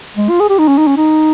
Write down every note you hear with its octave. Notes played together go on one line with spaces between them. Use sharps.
G#3
F4
G#4
G4
D#4
C#4
D#4
C#4
D#4